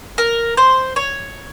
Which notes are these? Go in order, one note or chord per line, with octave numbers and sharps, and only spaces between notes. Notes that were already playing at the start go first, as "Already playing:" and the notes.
A#4
C5
C#5